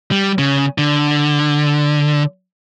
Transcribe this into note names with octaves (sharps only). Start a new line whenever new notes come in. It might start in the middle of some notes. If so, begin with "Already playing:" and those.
G3
C#3
D3